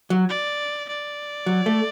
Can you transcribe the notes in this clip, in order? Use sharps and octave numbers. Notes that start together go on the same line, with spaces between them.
F#3
D5
D5
F#3
A3